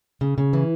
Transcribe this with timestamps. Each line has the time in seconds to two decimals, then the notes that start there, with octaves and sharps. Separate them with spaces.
0.21 C#3
0.38 C#3
0.53 E3